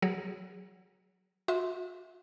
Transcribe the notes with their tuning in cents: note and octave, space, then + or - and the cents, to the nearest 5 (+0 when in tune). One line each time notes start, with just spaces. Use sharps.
F#3 +0 G#4 -20
F#4 -40 E5 -25 C6 +0